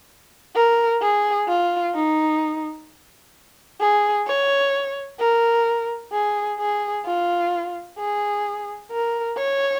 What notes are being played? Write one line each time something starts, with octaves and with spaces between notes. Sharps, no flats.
A#4
G#4
F4
D#4
G#4
C#5
A#4
G#4
G#4
F4
G#4
A#4
C#5